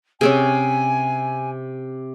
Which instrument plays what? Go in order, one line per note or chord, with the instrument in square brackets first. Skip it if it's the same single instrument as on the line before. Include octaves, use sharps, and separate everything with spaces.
[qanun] C3 C4 C#4 [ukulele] G#4 C#5 [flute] G#5